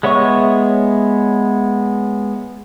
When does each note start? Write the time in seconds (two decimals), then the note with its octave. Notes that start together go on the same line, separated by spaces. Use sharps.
0.03 G#3 B3 C#5 E5 C#6